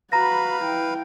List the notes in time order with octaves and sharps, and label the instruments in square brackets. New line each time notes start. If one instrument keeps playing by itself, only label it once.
[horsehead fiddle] F#4 B5 [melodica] B4 F5 [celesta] A#5 A#6
[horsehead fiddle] E4 G5